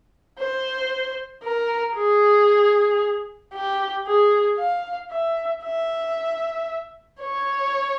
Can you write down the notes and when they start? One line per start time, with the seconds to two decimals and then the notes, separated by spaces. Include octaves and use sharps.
0.39 C5
1.43 A#4
1.95 G#4
3.54 G4
4.07 G#4
4.58 F5
5.11 E5
5.64 E5
7.22 C#5